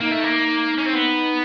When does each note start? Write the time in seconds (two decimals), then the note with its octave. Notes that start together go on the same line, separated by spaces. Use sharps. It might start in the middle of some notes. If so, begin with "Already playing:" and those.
0.01 A#3 D#4
0.12 A3
0.24 A#3
0.78 C#4
0.86 C4
0.94 B3